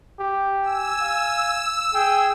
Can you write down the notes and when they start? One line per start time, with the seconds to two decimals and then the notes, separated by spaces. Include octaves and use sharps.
0.19 G4
0.62 G#5 E6
1.01 F5
1.94 G#4 G5